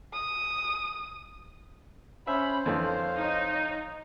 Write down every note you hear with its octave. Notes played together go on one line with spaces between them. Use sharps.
D#6
C#4 C5 E5 B5
F2 D3 E3 C#5 F5
D#4